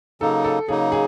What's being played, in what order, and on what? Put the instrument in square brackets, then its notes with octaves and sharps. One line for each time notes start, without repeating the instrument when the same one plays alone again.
[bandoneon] C#3 F#3 A#3 D#4 [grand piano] A4
[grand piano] A4
[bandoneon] C#3 F#3 A#3 D#4 [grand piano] G#4
[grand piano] G#4